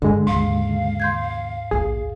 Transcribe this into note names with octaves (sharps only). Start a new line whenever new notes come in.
G2 D3 G#3
D#2 G#2 C#3 F5
C6 G6 G#6
A#1 D#2 G#4